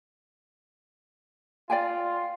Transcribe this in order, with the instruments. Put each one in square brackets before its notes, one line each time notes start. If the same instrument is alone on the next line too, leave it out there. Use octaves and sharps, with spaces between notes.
[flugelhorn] F4 [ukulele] D5 G5 G#5